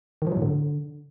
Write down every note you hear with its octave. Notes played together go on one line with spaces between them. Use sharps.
D#3
F3
F#3
A2
D3